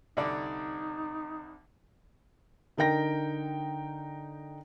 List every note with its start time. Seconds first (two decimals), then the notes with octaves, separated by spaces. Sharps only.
0.17 C2 D3 D#4 D5
2.77 D3 D#4 A#4 G5 A#6